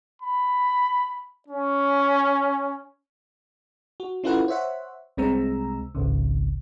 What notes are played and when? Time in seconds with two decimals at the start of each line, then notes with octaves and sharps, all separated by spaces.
0.22 B5
1.48 C#4
4.00 F#4
4.24 C#4 E4 F4 A4 B4 F#5
4.48 C5 C#5 E5 F#5
5.17 C2 C3 G#3 C4 A#5 E6
5.95 G#1 C#2 C#3